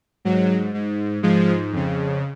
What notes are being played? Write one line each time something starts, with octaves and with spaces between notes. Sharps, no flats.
G#2 F#3
G#2
G#2 F3 G#3
F2 C#3